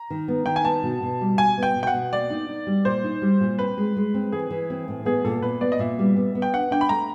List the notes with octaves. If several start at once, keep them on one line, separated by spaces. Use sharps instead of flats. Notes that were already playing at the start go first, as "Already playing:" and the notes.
Already playing: A#5
D#3
B3
D#3 G5
G#5
B3 A5
B2
B2
G3
B2 G#5
B3 G5
B2
G5
F#5
B2
A#3 D5
D#4
D#4
G3
A#2 C5
D#4
G3
A#2
C4 B4
G#3
G#3
C4
E3 G#4
E3
C4
A2
B3 G#4
A#2 A4
A#2 B4
B3 D5
D#5
A#2 E5
G3
B3
B3
G5
D4 F#5
D4 G5
B5
A3 A#5